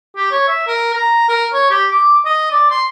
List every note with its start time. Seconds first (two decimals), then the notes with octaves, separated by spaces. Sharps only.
0.16 G4
0.31 C#5
0.48 E5
0.67 A#4
0.94 A#5
1.29 A#4
1.53 C#5
1.70 G4
1.90 D6
2.25 D#5
2.52 D5
2.70 C6